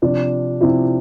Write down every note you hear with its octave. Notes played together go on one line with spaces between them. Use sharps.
C3 F3 D4
C3 F3 E4